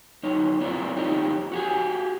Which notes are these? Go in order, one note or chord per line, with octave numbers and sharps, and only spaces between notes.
F#2 D#4 C#5
C4 E4 F4 A#4 D5
F2 D#4 G4 C#5 D#5
F#4 G4 G#5